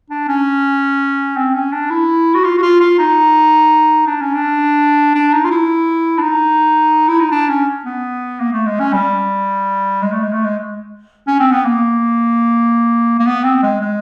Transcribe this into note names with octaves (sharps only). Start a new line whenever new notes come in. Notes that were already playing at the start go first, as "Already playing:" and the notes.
D4
C#4
C4
C#4
D4
E4
F#4
F4
F#4
F4
F4
D#4
D4
C#4
D4
D4
D#4
F4
E4
D4
D#4
E4
D#4
D4
C#4
B3
A#3
A3
G#3
C#4
G3
G#3
A3
G#3
A3
G#3
C#4
C4
B3
A#3
A#3
B3
C4
G#3
G#3